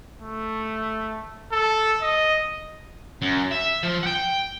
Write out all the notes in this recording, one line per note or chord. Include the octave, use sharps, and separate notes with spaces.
A3
A4
D#5
F#2
E5
F3
F#5 G5